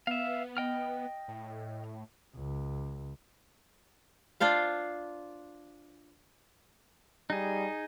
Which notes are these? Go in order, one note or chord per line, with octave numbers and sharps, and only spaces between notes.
B3 E5 F5
D#5 G5 F6
A2
C#2
D4 F4 C5 F5
G3 D#4 G#4